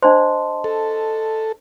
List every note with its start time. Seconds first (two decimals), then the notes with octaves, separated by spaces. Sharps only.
0.02 D4 C5 D#5 A5 C6
0.64 A4